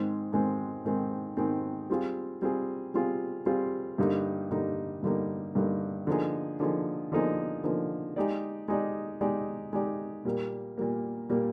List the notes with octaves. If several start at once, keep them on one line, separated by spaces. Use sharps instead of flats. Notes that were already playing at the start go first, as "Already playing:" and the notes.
Already playing: G#2 D#3 G#3 C4
G#2 D#3 G#3 C4
G#2 D#3 G#3 C4
G#2 D#3 G#3 C4
G3 C4 F4 G#4
G3 C4 F4 G#4
G3 C4 F4 G#4
G3 C4 F4 G#4
G2 D3 G3 A#3 D#4
G2 D3 G3 A#3 D#4
G2 D3 G3 A#3 D#4
G2 D3 G3 A#3 D#4
D3 F3 A#3 D#4 G#4
D3 F3 A#3 D#4 G#4
D3 F3 A#3 D#4 G#4
D3 F3 A#3 D#4 G#4
G#3 D#4 G4 D5
G#3 D#4 G4 D5
G#3 D#4 G4 D5
G#3 D#4 G4 D5
A#2 G3 A#3
A#2 G3 A#3
A#2 G3 A#3